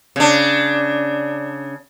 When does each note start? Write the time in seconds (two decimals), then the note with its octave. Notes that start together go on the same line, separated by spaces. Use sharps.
0.16 C#3 D4